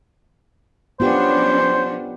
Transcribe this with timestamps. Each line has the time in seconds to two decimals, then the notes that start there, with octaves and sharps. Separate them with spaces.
1.00 F#3 B3 C#4 D4 F4 G4 C5